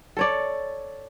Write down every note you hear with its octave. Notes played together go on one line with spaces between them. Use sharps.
A4 C#5 D5